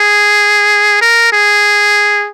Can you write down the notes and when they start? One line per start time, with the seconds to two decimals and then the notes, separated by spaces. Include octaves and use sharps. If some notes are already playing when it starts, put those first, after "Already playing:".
Already playing: G#4
1.02 A#4
1.33 G#4